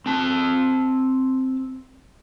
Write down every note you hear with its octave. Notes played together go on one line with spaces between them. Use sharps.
C4 A5